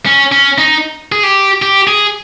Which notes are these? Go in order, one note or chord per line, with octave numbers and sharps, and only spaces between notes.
C#4
C#4
D#4
G#4
G4
G4
G#4